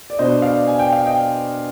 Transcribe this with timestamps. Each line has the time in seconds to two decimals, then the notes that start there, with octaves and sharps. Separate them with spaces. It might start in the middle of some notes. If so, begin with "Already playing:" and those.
0.10 D5
0.18 B2 B3 D4 C5 D#5
0.42 D5 F5
0.68 G#5
0.79 G5
0.92 F5
1.06 D#5 G5